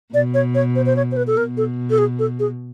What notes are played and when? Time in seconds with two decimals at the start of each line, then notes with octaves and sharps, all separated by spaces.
0.14 B2 D5
0.34 C#5
0.55 C#5
0.75 C5
0.86 C5
0.96 C#5
1.12 C5
1.17 B4
1.27 A4
1.37 B2 A#4
1.57 A4
1.90 A4
1.98 G#4
2.19 A4
2.39 G#4